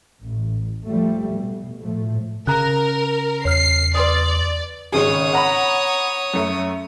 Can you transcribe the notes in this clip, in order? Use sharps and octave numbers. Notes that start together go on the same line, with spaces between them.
A1
F3 G3 A3
B2
A2 F3 A3
C#3 A#4 A#5 F#6
E2 C#5 F6 C7
B4 D5 C6 D#6
G#1 C#3 G#4 C#5 D#6
F#5 A#5 B5
F#2 A3